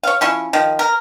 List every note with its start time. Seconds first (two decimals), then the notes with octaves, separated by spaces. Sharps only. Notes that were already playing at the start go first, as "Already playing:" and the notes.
0.03 C#5 F5
0.21 F3 C#4 E4
0.53 D#3 F3
0.79 A#4